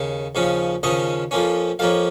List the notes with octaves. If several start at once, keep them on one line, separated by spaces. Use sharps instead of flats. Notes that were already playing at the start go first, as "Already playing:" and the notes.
Already playing: D#2 C#3
D#2 C#3 F3 C#4
D#2 C#3 F3 C#4 D#5
F2 F3 A#3 C#4
F2 F3 A#3 C#4 F5